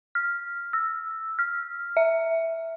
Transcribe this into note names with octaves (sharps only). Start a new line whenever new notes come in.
F6
E6
F6
E5